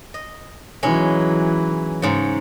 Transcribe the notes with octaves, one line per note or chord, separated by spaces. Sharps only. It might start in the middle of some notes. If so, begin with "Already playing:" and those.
D#5
E3 F#3 G#3 C#4 D#4
G#2 C#3